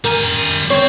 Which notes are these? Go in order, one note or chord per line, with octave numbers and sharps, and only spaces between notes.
G3 A#4 G#5
C4 C#5